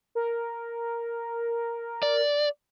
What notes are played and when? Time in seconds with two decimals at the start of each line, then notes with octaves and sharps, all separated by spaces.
0.15 A#4
2.03 D5